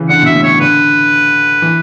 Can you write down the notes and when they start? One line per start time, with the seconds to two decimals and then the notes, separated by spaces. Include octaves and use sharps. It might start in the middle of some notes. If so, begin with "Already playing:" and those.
Already playing: C#3 E3
0.09 D3 F#5
0.22 B2
0.26 E5
0.35 A2
0.43 C#5
0.60 D3 B4
1.62 E3